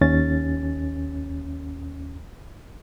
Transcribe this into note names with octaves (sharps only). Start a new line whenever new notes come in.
D#2 C#4 A6